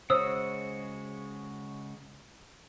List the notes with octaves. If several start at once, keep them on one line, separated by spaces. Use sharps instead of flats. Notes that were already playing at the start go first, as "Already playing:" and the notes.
C#3 G#3 F#4 C5 C#5 D#6 E6